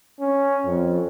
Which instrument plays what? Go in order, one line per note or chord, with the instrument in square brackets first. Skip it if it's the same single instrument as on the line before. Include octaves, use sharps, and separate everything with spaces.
[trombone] C#4
F2